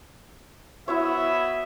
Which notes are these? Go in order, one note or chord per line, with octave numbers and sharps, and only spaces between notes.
B3 E4 F#4 C#5 E5